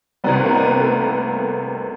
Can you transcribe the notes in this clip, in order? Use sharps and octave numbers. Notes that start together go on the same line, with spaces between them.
C2 C3 D#3 G3 B3
A#3
B3
A3